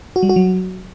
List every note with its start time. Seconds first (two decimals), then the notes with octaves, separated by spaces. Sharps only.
0.16 F#4
0.23 G3
0.29 F#4
0.36 F#3